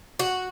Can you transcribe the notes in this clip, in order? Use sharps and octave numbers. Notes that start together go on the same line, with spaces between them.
F#4